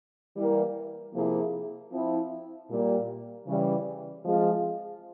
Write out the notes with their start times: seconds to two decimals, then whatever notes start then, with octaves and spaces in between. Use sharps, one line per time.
0.36 E3 G3 A#3
1.14 C3 F3 A#3 E4 G#4
1.91 F3 C4 E4
2.69 A#2 G3 A#3
3.46 C#3 E3 G3
4.24 F3 G#3 C4 F4 G#4